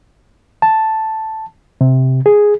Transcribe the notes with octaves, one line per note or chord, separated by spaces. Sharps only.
A5
C3
G#4